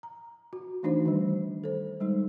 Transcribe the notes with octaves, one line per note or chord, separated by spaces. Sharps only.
A#5
F#4
E3 A3 D4 D#4 F#4 C5
D#3 G3
A4 C5
G3 G#3 D#4